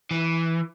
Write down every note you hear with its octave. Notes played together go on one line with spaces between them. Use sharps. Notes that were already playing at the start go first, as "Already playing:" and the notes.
E3